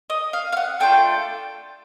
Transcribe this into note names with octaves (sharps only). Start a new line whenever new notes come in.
D#5
F5
F5
F#5
A3 D4 F4 A4 G5